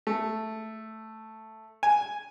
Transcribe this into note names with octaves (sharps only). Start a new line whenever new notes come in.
A3
G#5